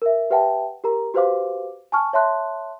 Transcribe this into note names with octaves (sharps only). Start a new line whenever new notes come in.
A#4 E5
G4 B4 E5 F#5 G5 A5
G4 A#4 A#5
F#4 G4 B4 C5 F5 D6
G#5 A5 C#6 F6
C#5 E5 A5 C6 F#6